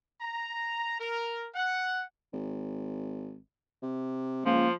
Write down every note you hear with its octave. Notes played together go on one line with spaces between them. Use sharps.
A#5
A#4
F#5
G#1
C3
C#2 F3 A#3